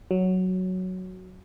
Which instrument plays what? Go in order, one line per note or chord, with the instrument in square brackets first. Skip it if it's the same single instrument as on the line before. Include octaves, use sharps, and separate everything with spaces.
[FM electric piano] F#3